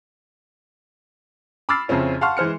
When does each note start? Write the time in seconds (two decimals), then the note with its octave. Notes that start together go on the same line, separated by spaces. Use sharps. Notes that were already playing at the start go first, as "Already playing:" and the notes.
1.69 B5 D6 E6 F6 A6 C7
1.88 F2 C#3 C4 C#4 E4
2.21 F5 F#5 A5 C6 C#6 F6
2.37 E3 G#3 C5 F6 C#7